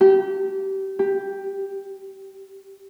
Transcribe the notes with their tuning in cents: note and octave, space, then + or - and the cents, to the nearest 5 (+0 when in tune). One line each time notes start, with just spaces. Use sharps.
G4 -25
G4 +5